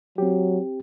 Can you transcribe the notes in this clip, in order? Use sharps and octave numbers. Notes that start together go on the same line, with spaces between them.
F#3 C4 G4